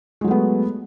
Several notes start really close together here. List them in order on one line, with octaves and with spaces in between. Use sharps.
G#3 F#3 A3 B3